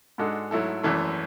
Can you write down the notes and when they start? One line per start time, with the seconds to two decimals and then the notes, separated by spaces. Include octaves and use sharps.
0.18 G#2 G#3 D4 F#4 A4
0.51 G#2 F#3 A3 E4 A4
0.83 G#1 F#2 E3 A3